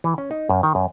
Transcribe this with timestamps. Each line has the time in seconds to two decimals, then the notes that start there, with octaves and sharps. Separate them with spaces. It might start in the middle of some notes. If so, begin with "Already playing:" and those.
0.04 E3
0.18 C#4
0.31 D#4
0.49 F#2
0.63 D#3
0.75 F#2